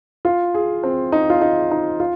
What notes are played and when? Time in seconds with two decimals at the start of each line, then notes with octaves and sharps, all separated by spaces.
0.25 F4
0.54 G#4
0.83 C4
1.12 D#4
1.30 F4
1.41 D#4
1.71 D#4
2.00 F4